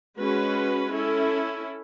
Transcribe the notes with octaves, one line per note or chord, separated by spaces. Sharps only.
G#3 C#4 F#4 B4
C#4 E4 A4